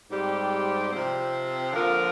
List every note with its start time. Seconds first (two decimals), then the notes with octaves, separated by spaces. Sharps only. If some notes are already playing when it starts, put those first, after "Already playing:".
0.11 G#2 G3 C4 G4
0.92 C3 F3 C4
1.73 D3 F3 A#3 F4 A#4